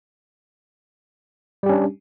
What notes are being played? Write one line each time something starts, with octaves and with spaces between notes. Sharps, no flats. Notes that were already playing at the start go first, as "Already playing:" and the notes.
G3 C#4 D4 G4